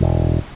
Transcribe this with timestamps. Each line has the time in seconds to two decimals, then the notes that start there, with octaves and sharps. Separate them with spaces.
0.01 E1